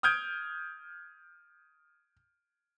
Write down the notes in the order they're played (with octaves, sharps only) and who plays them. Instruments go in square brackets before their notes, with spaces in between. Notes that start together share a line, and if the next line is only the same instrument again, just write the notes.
[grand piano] D#6 F6 G6 G#6 D7